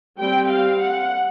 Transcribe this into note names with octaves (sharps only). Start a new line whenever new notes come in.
G3 C4 G5
F5
F#5